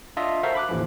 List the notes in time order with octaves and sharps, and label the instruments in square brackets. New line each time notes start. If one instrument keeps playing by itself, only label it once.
[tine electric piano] D4 F4 D#5 E5
F#4 A4 A#4 C5 E5 F5
B5 D6 F#6
A1 D#2 D3 E3 F3